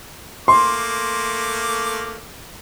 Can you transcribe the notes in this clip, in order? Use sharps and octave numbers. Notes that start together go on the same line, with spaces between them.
A3 A#3 C6 D6